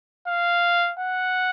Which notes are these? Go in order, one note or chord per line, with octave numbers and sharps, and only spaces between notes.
F5
F#5